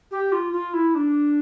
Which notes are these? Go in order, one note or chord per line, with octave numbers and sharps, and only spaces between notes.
G4
F4
F4
E4
D4